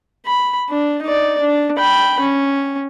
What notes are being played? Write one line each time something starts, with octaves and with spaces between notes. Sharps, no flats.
B5
D4
D#4 D5
D4
G5 B5
C#4